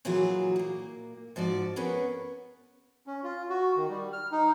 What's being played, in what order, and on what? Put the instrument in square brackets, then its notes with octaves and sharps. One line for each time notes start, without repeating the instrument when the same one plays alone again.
[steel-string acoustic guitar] A#2 E3 F#3 F4 F#4 G#4
A#2 A#3
G#2 F3 F#4 D5
B3 C#4 G#4 A#4 B4
[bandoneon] C#4
F4
F#4
D#3
G3
F6
D#4